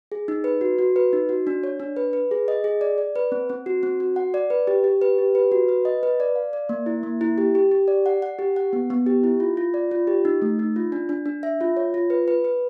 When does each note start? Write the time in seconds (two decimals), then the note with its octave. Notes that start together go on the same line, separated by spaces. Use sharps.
0.12 G#4
0.28 D#4
0.44 B4
0.61 F#4
0.79 F#4
0.96 B4
1.13 D#4
1.29 F#4
1.47 D4
1.64 C#5
1.80 D4
1.96 B4
2.13 B4
2.31 G#4
2.48 D#5
2.64 G#4
2.81 D5
2.98 D5
3.16 B4
3.32 C4
3.50 C4
3.66 F#4
3.83 C4
4.00 F#4
4.16 F#5
4.34 D5
4.50 B4
4.67 G4
4.84 G4
5.02 B4
5.18 G4
5.35 B4
5.52 F#4
5.69 B4
5.85 D#5
6.03 B4
6.20 D5
6.36 F5
6.53 D5
6.69 A#3
6.86 E4
7.03 A#3
7.21 E4
7.38 G4
7.55 G4
7.71 G4
7.88 D5
8.06 F#5
8.22 F#5
8.39 G4
8.56 F#5
8.73 B3
8.90 B3
9.06 G4
9.24 E4
9.40 F4
9.57 F4
9.74 D5
9.91 F4
10.07 G4
10.25 D#4
10.42 A3
10.59 D#4
10.76 F4
10.92 D4
11.09 D4
11.26 D4
11.43 E5
11.61 F4
11.77 C#5
11.94 F4
12.10 B4
12.28 B4
12.44 B4